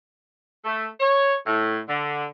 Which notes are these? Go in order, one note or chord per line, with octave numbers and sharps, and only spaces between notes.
A3
C#5
A2
D3